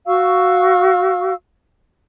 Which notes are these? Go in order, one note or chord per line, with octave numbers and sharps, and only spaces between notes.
F#4 F5 C#6 E6